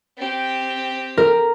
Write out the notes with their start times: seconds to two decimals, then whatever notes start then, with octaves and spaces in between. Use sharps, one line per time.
0.17 C4 G4
1.17 A#4